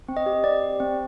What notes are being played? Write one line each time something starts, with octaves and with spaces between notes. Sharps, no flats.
C4
D#5
G4
C4 D5
G4
C4